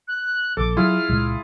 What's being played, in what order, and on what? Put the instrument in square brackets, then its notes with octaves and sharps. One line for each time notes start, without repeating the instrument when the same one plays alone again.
[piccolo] F#6
[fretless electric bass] A#1 [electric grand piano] A4 [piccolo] D6
[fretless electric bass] F#3 [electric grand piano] E4 F4 G#4 [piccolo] F6
[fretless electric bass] C#2 A#2 G#3